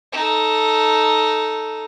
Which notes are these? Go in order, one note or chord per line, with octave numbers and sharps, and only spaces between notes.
D#4 A4